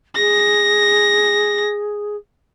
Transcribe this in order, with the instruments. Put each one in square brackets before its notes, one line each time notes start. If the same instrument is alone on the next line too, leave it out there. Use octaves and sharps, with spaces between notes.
[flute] G#4 [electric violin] A#6